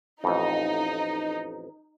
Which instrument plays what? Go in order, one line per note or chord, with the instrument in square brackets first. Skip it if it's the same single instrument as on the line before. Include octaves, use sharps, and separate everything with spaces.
[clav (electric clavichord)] A1 F2 [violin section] D#4